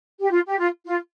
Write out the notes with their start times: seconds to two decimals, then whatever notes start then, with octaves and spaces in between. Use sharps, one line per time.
0.21 G4
0.31 F4
0.48 G4
0.58 F4
0.87 F4